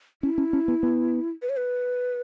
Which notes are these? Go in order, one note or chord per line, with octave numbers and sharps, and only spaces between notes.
C#4 E4
C#4
C#4
B3
B3
B4
C#5
B4